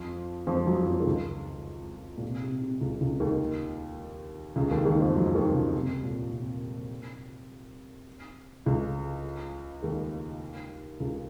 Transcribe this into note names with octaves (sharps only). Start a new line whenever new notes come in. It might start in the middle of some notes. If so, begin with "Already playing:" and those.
Already playing: F2 F3
F2 F3
F#2 F#3
F2 F3
D#3
C#2 C#3
A#2
C3
C3
C3
C#2 C#3
C#2 C#3
D#2 D#3
C#2 C#3
D#2 D#3
D#2 D#3
F2 F3
F#2 F#3
D#2 D#3
C#2 C#3
C3
A#2
C3
C#2 C#3
D#2 D#3
C#2 C#3